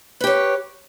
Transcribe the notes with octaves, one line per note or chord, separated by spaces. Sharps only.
G4 B4 C#5